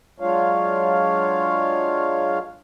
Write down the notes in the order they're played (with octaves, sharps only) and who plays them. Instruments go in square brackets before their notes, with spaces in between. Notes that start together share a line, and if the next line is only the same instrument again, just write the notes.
[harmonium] F#3 G#3 D4 F4 C#5 F5